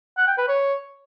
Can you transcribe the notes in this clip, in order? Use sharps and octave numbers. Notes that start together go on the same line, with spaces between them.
F#5
G5
B4
C#5